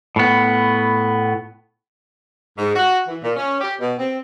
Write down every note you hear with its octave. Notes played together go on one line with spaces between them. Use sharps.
A2 B3
G#2
F#4
E3
A#2
C#4
G4
B2
C4